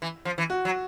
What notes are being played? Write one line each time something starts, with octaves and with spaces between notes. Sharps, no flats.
E3
F3
E3
F#4
F#3